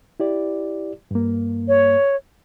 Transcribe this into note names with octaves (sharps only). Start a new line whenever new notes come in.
E4 G4 D5
G2 A#3
C#5